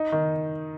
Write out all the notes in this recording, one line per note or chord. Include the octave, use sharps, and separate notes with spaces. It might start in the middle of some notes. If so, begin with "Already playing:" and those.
Already playing: D#4
D#3